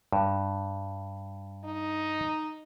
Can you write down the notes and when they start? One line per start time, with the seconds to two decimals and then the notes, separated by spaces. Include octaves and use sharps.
0.13 G2
1.65 D#4